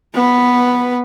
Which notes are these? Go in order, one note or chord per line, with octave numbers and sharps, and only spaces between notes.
B3 B4